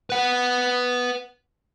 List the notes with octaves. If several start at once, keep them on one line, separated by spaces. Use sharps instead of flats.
B4 F#5